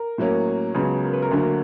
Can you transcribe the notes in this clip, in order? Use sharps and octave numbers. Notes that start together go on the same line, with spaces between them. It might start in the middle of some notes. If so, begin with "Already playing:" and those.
Already playing: A#4
A2 F#3 A#3 C#4
C#2 C#3 F#3 B3
A#4
B4
A#4
D2 D3 F#3 A#3